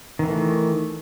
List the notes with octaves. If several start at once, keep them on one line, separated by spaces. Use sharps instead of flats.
D#3 E3 A3